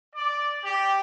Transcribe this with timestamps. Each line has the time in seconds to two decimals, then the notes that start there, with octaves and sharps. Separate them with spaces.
0.13 D5
0.62 G4